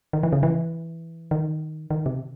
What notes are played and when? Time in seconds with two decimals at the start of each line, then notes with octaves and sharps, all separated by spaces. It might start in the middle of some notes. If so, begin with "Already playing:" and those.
0.13 D#3
0.23 E3
0.32 C#3
0.43 E3
1.31 D#3
1.90 D#3
2.06 C3